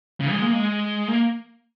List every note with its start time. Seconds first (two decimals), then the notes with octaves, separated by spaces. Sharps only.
0.20 C#3
0.31 G#3
0.42 A#3
0.53 G#3
1.08 A#3